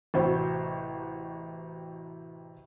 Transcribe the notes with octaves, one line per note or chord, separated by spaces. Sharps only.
A1 C3 F#4 C5